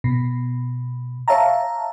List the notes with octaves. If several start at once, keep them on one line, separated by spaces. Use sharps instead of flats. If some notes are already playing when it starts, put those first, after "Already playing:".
B2
C#5 E5 F5 A5 A#5